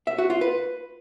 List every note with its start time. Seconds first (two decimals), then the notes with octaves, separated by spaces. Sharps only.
0.07 E5
0.18 F#4
0.30 F4
0.41 B4